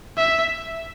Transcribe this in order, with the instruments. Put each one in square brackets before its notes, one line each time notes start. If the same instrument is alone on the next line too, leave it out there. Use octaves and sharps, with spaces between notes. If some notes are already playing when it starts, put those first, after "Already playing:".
[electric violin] E5